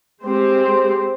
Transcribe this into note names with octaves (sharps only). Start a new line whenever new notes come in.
G#3 C4 G4 C5